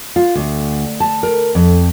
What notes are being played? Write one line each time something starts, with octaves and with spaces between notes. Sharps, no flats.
F4
D2
A5
A#4
F2